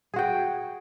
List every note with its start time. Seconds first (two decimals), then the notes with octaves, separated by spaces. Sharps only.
0.14 G#4
0.16 F#4
0.19 G5